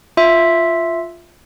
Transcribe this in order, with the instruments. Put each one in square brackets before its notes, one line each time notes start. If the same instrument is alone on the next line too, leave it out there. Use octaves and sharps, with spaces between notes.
[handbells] F4 E5